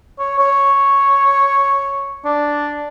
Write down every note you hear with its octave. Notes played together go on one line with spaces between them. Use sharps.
C#5
C#5
D4